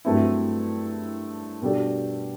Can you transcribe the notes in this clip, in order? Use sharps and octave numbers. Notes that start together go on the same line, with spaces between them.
G2 F#3 A3 C4 E4
B2 G3 D4 A4